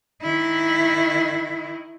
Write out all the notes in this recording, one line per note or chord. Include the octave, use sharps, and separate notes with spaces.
D#3 E4